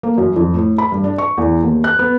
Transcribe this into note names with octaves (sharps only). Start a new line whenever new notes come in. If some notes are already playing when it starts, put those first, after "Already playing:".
A#3
F#2
F2
A2
B5
G2
D4
C#6
E2
D#2
F#6
B3